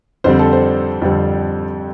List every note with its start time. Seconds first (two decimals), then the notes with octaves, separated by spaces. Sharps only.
0.24 F2 D3 G3 C4 C5
0.39 A4
0.53 C5
1.02 F2 D3 G3 C4